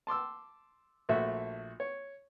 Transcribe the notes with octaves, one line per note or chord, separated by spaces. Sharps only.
A5 C6 D6 E6
A#1 A3 F#4 E5
C#5